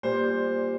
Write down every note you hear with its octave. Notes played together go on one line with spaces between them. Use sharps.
A#2 G3 C5